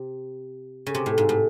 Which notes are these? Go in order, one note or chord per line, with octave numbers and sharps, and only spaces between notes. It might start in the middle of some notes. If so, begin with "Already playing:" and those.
Already playing: C3
C#3
C3
A2
G#2
A2